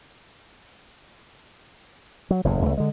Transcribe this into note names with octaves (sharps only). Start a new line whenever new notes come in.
F#3
F#1 E2 A2
C#2 A3
D3 G#3